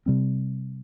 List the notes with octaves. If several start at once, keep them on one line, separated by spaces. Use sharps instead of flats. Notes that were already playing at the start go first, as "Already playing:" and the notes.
C3 G3 C4